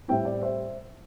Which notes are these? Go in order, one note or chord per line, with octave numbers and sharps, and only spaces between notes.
A2 G3 C4 E4 E5 G5
D5
C5 E5